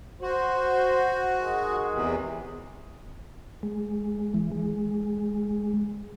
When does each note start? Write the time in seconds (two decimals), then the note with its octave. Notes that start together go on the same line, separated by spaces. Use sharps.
0.21 F#4 C5
1.39 D#3 G#3 G#4
1.93 E2 C3 E3
3.63 G#3
4.34 E3
4.52 G#3